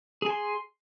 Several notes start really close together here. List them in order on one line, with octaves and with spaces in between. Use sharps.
G#4 G#5 C6